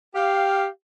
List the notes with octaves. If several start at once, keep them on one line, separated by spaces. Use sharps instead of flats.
G4 F5